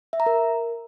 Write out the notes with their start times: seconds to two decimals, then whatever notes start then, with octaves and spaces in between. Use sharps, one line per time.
0.13 E5
0.20 A#5
0.26 A#4